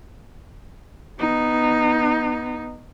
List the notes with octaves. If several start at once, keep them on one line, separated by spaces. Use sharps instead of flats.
B3 D#4